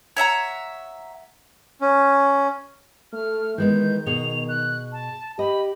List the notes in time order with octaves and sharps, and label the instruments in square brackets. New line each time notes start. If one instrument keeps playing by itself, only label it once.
[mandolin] C#5 E5 F#5 A#5
[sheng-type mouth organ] C#4
[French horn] A3 [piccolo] F6
[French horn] D#3 [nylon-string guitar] E3 G#3 B3 [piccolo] G6
[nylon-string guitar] B2 G#4 F#5 [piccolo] F7
[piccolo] F#6
A5
[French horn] G4 [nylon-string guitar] D#5 [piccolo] B5